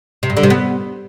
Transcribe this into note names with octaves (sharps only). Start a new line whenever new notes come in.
C3
G2
D3
C3
B3